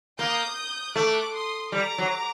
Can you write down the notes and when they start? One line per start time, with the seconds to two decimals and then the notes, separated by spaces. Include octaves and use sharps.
0.19 A#3 D#6 G6
0.96 A3 D6 F#6
1.34 C6 D#6
1.72 G3 A#5 D6
1.98 F#3